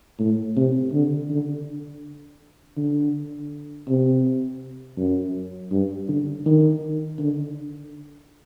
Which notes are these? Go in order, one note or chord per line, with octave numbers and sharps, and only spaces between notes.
A2
C3
D3
D3
D3
C3
F#2
G2
D3
D#3
D3